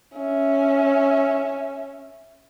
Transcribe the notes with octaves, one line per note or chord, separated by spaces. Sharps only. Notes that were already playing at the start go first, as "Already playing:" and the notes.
C#4 E5